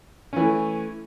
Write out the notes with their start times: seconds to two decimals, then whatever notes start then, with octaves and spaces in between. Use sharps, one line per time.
0.33 C#4
0.36 E3
0.40 A3